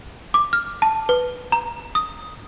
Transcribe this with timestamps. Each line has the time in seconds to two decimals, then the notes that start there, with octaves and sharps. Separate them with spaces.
0.34 D6
0.53 F6
0.82 A5
1.09 B4
1.52 A#5
1.95 D#6